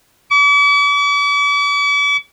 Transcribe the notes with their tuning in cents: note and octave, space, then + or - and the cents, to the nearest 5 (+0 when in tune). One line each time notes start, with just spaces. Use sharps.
D6 -45